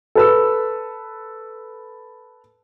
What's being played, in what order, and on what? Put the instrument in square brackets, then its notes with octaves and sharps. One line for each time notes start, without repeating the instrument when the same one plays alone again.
[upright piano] A4 B4 E6